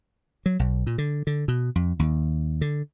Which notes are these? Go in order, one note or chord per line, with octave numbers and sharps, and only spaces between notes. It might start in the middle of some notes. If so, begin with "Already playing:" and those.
F#3
B1
A#2
D3
D3
B2
F2
D#2
D3